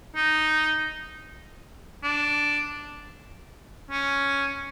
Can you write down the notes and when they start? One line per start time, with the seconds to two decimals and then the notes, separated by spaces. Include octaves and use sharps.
0.16 D#4
2.03 D4
3.90 C#4